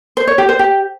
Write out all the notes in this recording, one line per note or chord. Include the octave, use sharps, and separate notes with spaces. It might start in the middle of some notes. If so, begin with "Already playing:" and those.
C5
C#5
G4
C5
G4